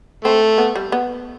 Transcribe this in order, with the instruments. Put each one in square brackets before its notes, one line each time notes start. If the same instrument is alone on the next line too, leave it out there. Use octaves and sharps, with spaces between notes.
[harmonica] A3 [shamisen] C4
[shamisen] B3
G3
B3